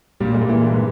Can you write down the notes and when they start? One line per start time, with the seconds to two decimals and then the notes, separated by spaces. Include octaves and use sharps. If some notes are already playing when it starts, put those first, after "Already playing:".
0.20 A#2 G3
0.35 G#3
0.41 A#2
0.49 E3
0.63 G2 G3